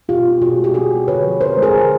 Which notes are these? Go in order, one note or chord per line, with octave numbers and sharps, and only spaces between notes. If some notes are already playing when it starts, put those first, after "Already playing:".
B2 F4 G4
B3
B2 F#4 G#4
G#3
G4
C4 F#4 G#4
G#3
D3 B4 C#5
F3
C4 A#4 C5
G#3
G#4 A#4
D3